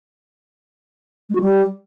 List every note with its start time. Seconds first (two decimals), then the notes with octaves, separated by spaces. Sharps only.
1.29 G#3
1.35 F#4
1.41 G3